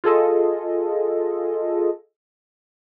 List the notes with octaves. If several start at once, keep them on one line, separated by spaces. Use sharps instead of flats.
F4 G#4 A4 D#5